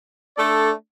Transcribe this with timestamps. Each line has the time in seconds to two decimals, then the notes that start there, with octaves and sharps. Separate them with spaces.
0.37 A3 D4 A4 D5